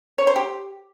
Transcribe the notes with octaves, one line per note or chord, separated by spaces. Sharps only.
C#5
C5
G4